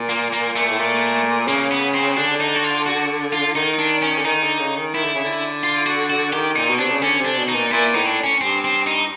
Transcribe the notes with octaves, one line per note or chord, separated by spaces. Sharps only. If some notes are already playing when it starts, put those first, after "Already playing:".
Already playing: A#2
A#3
A#3
A3
A2
A#2
C#3 A#3
B3
C4
D3 D4
D#4
F#4
F4
F#4
F4
D#3 D#4
D4
C#4
D3
D#3 D#4
D3
C#3
D#3
D#3 E4
D3
C#3
D3
F4
F#4
F#4
D#3 G4
A#2 D#4
B2
C3 D4
C#3
D3 C#4
C3
D4
B2
D#4
A#2
A#2 E4
A2 D#4
D4
C#4
G2 C4
C4
D#4